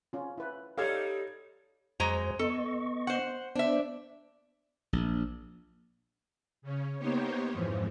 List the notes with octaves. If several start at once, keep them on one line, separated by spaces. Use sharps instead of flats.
C#4 F4
E4 B4
G3 D#4 G4 A4 C#5 F5 E6 G#6
F2 F#3 G#3 C5 A#5
B3 A4 D#5 C#6
C5 F#5
B3 D4 C5 E5
A#1
C#3 C#4
A#3 B3 D#4 G4 C5 C#5
F2 G#2 E3 F3